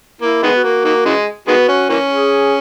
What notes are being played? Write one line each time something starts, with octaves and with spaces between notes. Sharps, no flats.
A#3 E4
D#3 G#3 B3
F#4
A#3
D#3 A#3
C#3 E3 G#3
D#3 G#3 B3 F#4
C#4
E3 A#3 C#4
G#4